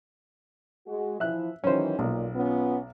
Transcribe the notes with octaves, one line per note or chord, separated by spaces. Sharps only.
G#3 F#4
E3 F3 E5 F#6
D#3 E3 F#3 C#4 C5
B1 A#2
B3 C#4 F4